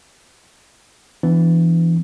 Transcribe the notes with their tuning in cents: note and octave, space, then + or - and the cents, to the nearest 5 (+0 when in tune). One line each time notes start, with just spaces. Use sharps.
E3 +20 B3 +35 D4 +20